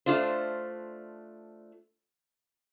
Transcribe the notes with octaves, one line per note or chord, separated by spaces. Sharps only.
A3 D4 F4 C5